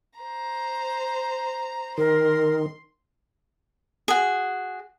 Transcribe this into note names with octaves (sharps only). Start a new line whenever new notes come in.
C5 A#5
D#3 A#4 C6
F#4 G#4